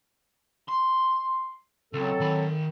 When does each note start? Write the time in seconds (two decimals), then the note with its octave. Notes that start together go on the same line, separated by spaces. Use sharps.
0.68 C6
1.93 C#2 F#3 C4 A4
2.20 D#3 B5